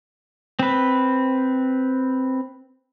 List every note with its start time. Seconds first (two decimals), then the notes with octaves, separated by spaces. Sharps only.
0.59 C4 B4